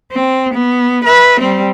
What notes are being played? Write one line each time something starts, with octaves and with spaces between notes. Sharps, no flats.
C4
B3
B4 E5
G3 C4